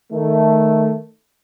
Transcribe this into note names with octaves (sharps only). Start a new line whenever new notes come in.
D#3 A3